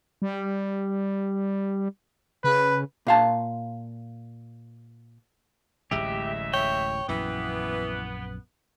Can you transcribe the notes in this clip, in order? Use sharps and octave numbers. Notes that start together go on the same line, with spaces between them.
G3
C#3 B4
A#2 F5 A5
D1 A1 C#3 G#3 G4 D#5 E5
C#5 G5
A#1 F#2 E3 B3